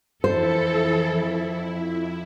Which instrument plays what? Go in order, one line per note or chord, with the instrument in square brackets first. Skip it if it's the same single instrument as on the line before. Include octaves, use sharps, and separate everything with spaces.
[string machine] F2 E4 [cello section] E3 A4 [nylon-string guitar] C5